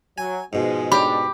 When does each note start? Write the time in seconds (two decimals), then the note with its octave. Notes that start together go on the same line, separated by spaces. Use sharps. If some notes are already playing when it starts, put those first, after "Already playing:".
0.18 F#3 G#5
0.53 G#2 B2 F3 G#3
0.92 G#3 D4 G4 B5